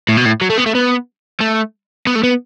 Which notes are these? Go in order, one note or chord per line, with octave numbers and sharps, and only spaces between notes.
A2
B2
A2
F#3
A3
B3
A3
B3
A3
B3
A3
B3